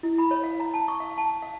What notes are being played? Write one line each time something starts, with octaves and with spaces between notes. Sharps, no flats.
E4
B5
C#5
F5
A#5
A5
C#6
F5
A5
F5